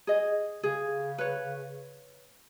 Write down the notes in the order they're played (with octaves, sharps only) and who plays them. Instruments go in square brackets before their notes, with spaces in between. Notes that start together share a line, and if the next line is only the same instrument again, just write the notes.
[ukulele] G#4 D#5
[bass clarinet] C#3 [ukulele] G#4
[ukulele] B4 C#5